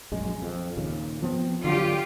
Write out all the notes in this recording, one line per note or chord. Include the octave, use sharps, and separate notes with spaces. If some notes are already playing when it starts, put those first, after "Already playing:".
A#1 F#2 G#3
F2
D#2 A#2 C#3
F3 B3 C4
D3 F#3 D4 F4 G4